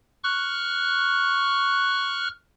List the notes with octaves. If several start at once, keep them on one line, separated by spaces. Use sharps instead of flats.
C#6 F6 F#6